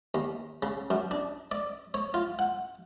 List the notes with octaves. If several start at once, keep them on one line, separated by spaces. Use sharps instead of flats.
D#2
C#3
F#2
D4
D5
C#5
F4
F#5